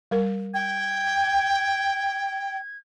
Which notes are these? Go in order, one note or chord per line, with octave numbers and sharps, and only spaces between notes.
G3 A#4
G5 G#6